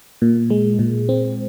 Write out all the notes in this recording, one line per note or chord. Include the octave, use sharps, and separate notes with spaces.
A#2
G#3
A#2
C4